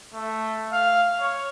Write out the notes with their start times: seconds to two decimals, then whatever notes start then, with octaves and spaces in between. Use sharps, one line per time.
0.14 A3
0.73 F5
1.20 C#5